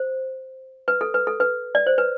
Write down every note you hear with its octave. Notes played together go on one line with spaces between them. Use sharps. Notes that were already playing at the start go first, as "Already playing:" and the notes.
Already playing: C5
B4
A4
B4
A4
B4
D5
C5
B4